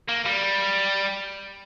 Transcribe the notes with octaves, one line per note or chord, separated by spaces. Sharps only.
A#3
G3